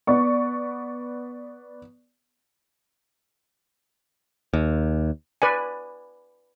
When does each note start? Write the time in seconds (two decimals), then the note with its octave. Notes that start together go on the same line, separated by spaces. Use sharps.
0.07 B3 D5 C#6
4.54 D#2
5.42 B4 D5 G#5